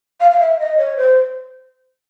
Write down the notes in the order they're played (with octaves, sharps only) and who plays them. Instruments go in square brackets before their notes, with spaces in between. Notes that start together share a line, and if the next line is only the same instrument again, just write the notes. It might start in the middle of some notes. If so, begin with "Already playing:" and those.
[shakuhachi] F5
F5
E5
D#5
C#5
C5